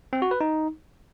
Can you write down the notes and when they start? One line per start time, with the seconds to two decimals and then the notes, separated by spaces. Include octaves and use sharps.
0.13 C4
0.22 F#4
0.31 B4
0.41 D#4